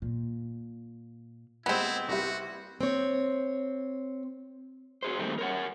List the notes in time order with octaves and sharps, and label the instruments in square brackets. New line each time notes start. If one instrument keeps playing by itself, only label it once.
[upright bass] A#2
[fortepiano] A#2 G3 G#3 [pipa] B3 C4 [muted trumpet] E4
[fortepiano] C2 G3 E4 [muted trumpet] F#4
[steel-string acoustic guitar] C4 C#5
[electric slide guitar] F#4 G#4 C5
D#3 G3 A3 A#3 C4
A#4 C#5 F#5